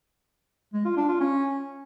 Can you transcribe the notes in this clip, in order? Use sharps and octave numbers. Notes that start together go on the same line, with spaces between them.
G#3
F4
D4
F4
C#4